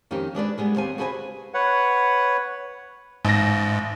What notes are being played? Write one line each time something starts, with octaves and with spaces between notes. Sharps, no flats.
F2 D#3 C#4 D#4 G4
G#3 D4 B4 D5
G3 G#3 B3
D#2 C4 G4 G#5
F#4 G#4 B4 C5 F5 G#5
B4 C#5 F#5
A1 G#2 A#6